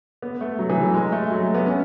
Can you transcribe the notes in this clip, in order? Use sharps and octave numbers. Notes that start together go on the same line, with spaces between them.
B3
A3
F#3
E3
F#3
G#3
A3
F#3
A3
B3
C#4